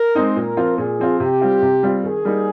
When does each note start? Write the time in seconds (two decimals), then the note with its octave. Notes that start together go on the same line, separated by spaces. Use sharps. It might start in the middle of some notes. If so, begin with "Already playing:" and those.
Already playing: A#4
0.15 G#3 C4 D#4
0.36 A#2 A#4
0.57 F3 C4 F4
0.78 A#2 G#4
0.99 F3 C4 F4
1.20 C3 G4
1.41 G3 C4 F4
1.62 C3
1.83 G3 C4 F4
2.04 D#3 G#4
2.25 G3 A#3 D#4